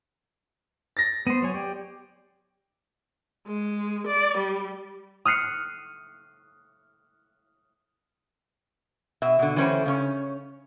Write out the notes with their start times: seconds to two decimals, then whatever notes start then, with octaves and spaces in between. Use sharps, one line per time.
0.97 A6 A#6
1.27 B3 C5 D#7
1.42 F#3 C#5 G#5
1.54 G4 D5
3.48 G#3
4.07 D5
4.38 G3
5.25 D#6 F6 F#6 C7 C#7
9.22 B2 E5
9.39 B2 D3
9.56 E3 G3 A3 C#4 A#4 C5
9.86 C#3 C#4